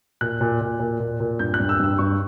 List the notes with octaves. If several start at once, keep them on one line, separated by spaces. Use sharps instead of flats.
A#2 F#6
A#2
A#2
A#2
A#2
A#2
G2 G6
F#6
G2
E6
G2 E6
G2 C#6